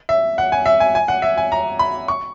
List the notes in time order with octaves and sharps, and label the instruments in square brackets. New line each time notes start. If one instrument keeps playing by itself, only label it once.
[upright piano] E5
F#5
G#5
E5
G#5
G#5
F#5
E5
G#5
A#5
B5
C#6